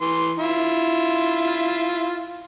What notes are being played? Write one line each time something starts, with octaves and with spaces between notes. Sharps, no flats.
E3 C6
E4 F4